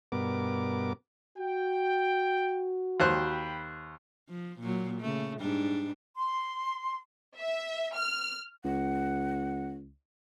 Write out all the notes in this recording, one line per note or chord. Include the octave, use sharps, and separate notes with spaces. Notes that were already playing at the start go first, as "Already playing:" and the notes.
G2 B2 B3 A#4 D6
F#4 G5
D#2 C5 G5 B5 F#6
F3
A#2 F#3
C#3 A3
G#2 G3 D4
C6
E5
F6
C#2 F#5